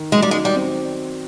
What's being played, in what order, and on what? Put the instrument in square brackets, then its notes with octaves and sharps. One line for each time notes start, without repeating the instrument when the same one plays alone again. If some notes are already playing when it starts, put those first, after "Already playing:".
Already playing: [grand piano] D#3
[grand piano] F#3 [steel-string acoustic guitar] G#3
[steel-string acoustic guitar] G3
[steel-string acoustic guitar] G#3 [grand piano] D#4
[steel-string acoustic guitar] G3
[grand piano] C4